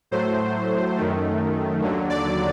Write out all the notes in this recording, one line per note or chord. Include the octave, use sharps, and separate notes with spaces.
A2 F#3 A3 C5
F#2 D#3 A3
D#2 D3 F#3
D5